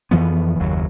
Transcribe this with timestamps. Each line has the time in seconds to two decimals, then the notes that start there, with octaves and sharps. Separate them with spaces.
0.11 F2 E3 F3 B3
0.59 F#1 D#2 F#3